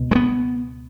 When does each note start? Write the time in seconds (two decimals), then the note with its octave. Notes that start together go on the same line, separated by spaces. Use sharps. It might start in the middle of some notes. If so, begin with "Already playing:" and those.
Already playing: C#2 B2
0.11 G#3
0.15 B3